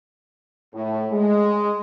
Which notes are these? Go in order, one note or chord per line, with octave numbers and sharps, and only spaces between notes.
A2
G#3